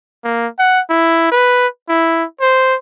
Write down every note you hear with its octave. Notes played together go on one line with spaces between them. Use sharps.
A#3
F#5
E4
B4
E4
C5